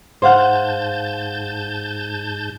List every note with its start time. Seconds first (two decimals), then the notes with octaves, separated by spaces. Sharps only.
0.22 G#2 C5 F5 F#5 A5 G6